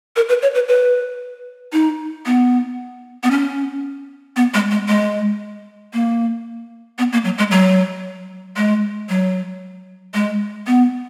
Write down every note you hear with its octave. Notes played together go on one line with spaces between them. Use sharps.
A#4
B4
C#5
B4
B4
D#4
B3
B3
C#4
B3
G#3
G#3
G#3
A#3
B3
A#3
F#3
G#3
F#3
G#3
F#3
G#3
B3